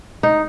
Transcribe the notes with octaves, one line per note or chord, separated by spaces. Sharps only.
D#4